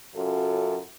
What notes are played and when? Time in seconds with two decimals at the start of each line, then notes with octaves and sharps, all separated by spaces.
0.15 F#2 C#3 F4 F#4 A4